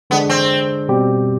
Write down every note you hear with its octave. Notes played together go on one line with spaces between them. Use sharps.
D3 G#3 B3 D4 G#4
C4
B2 G3 C4 G4